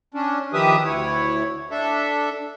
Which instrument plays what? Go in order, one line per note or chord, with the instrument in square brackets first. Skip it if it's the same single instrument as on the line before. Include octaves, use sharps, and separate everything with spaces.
[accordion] C#4 D4
D#3 F3 G4 B4 E5 D#6
D2 E4 C#5
D4 A4 E5